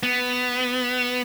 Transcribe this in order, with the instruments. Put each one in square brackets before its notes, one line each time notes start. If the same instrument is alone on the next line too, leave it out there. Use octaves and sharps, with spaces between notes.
[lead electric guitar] B3